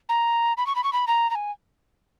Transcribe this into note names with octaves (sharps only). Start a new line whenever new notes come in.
A#5
B5
C#6
B5
C#6
B5
A#5
A#5
G#5